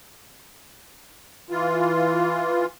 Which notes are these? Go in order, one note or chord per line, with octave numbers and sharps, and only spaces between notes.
E3 F4